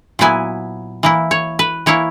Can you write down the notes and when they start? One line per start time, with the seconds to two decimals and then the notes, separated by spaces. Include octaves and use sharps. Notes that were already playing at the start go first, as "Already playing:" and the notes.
0.19 A#2 F#3 B3 E4 G#5
1.03 E3 A#3 E4
1.31 C#5
1.59 B4
1.86 E3 A#3 E4 C#5